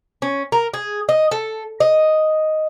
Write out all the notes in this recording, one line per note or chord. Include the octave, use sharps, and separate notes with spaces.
C#4
A#4
G#4
D#5
A4
D#5